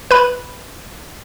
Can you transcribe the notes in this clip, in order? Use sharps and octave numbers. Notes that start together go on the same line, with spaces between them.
B4 B5